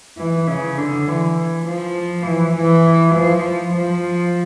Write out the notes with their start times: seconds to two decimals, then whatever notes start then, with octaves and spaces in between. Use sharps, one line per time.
0.18 E3
0.48 C#3
0.77 D3
1.07 E3
1.67 F3
2.26 E3
2.56 E3
3.15 F3
3.75 F3